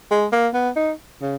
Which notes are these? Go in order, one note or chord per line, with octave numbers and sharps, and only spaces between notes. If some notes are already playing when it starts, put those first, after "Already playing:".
G#3
A#3
B3
D#4
C#3